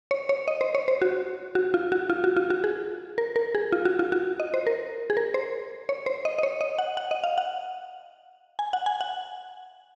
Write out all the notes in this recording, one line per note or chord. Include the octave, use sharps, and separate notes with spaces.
C#5
C#5
D#5
C5
C#5
C5
F#4
F#4
F4
F#4
F4
F#4
F4
F#4
G#4
A#4
A#4
G#4
F4
F#4
F4
F#4
D#5
C5
A#4
G#4
A#4
C5
C#5
C5
D#5
D#5
C#5
D#5
F#5
F#5
D#5
F5
F#5
G#5
F#5
G#5
F#5